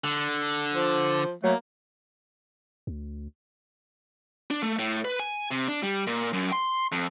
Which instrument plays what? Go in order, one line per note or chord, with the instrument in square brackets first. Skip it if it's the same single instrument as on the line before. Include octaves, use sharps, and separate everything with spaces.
[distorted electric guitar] D3
[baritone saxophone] F3
[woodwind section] F#3 A3 [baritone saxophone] A#3
[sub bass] D2
[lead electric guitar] D4
A3
A2
B4
G#5
C3
D4
G3
A#2
F#2
C6
F2